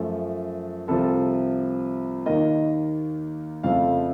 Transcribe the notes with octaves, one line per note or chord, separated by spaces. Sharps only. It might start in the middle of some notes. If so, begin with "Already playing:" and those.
Already playing: F#2 F3 A3
C2 C3 F3 A4
D#2 D#3 A#3 D#5
F2 C#3 F3 A3 F5